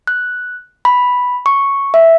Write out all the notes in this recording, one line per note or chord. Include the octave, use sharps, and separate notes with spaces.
F#6
B5
C#6
E5